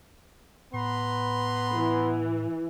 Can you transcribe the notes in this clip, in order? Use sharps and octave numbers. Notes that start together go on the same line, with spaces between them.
A2 B3 B4 A#5 C6
E3